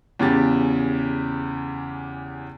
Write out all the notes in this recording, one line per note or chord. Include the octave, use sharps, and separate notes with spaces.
E2 C#3 G4 A6